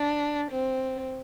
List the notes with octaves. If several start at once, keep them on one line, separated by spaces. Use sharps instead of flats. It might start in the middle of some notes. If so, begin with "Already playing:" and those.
Already playing: D4
C4